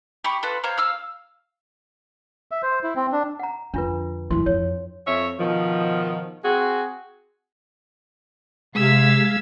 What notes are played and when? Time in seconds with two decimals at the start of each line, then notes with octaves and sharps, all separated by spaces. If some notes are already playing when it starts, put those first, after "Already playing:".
0.24 G4 B5 C#6
0.43 F4 A4 B4
0.63 C5 C#5 F5 A#5
0.77 F5 E6 F6
2.51 E5
2.63 C5
2.83 E4
2.96 C4
3.12 D4
3.39 F#5 A#5
3.74 F2 D3 D4 F4 B4
4.31 F#2 E3 C6
4.46 F2 C#5
5.07 F2 C#5 E5
5.40 B2 D#3 F3
6.44 C4 F#4 G#4
8.75 C3 G#3 F5 E6 G#6 B6